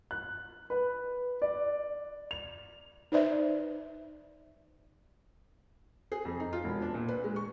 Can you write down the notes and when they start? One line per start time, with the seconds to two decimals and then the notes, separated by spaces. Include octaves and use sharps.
0.11 F#6
0.70 B4
1.42 D5
2.31 F7
3.12 D#4 B4 C5 D5 E5
6.12 G#4
6.25 F2
6.40 D#4
6.53 F4
6.65 E1
6.82 D4
6.94 A#2
7.08 B4
7.24 G#3
7.36 C#6